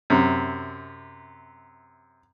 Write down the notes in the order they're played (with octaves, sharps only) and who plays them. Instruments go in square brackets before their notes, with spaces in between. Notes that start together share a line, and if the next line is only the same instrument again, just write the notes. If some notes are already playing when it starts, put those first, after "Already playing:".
[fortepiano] F#2 C3